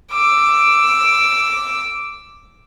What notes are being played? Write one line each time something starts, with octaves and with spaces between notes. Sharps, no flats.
D6 E6